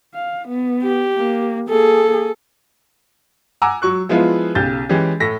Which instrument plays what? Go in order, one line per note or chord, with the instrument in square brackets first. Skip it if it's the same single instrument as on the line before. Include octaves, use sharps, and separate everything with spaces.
[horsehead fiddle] F5
B3
[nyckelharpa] G4
[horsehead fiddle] A#3
[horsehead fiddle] A#3 G#4 [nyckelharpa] A4
[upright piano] F#5 G#5 A#5 D6 E6
F#3 C#6 F#6
F3 G#3 B3 E4 F4
B1 C#3 G4 G6 A6
E3 G#3 C#4 G4 G#4
A2 A4 A#6 B6